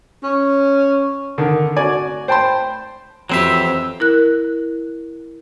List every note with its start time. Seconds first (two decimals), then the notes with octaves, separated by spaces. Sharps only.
0.23 C#4
1.38 D3 D#3
1.77 F#4 D5 G#5
2.28 C5 G5 A5 B5 C6
3.30 F2 E3 F#3 C4 G4 E5
4.00 E4 A#4 F#6